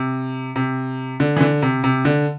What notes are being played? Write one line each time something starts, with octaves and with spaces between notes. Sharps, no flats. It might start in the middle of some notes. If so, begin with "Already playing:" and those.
Already playing: C3
C3
D3
E3
D3
C3
C3
D3